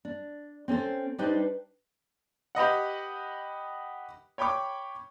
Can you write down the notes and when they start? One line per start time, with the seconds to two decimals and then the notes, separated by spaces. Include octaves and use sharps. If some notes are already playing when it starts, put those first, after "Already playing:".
0.05 D4
0.68 C4 C#4 A4 C5
1.18 G3 D4 D#4 G4 B4 C5
2.55 G4 B4 D#5 F#5
4.38 C#5 G5 B5 C#6 D6